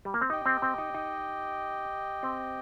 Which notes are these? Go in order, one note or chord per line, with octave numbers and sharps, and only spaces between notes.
G3
A#3
C4
D#4 G4 D#5 G5
C4
C4
D#4
D#4
C4